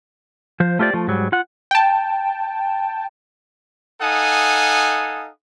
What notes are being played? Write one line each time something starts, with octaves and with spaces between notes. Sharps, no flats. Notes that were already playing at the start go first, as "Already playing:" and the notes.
F3 C5
A3 F4 G4 C5 D5
F3 A3
G#2 F#3 G3
F4 F#5
G5 A5
D#4 A4 F5 F#5 G#5 D#6